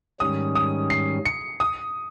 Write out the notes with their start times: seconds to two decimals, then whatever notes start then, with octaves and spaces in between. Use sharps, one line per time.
0.20 G#2 D#3 G3 C#4 D#6
0.55 D#6
0.90 C7
1.25 C#7
1.60 D#6